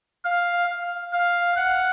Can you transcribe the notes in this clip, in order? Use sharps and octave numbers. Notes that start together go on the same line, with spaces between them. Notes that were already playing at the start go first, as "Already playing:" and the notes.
F5
F5
F#5